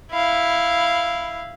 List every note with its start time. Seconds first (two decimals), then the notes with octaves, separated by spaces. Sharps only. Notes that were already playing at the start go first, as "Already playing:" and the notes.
0.12 E4 F5